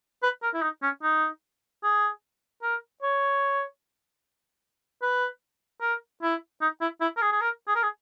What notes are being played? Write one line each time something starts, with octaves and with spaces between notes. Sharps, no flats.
B4
A#4
E4
D#4
C#4
D#4
G#4
A#4
C#5
B4
A#4
E4
D#4
E4
E4
A#4
G#4
G#4
A#4
G#4
A#4
G#4